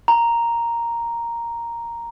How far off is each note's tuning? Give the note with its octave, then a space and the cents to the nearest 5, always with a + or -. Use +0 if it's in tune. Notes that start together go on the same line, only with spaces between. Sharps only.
A#5 +0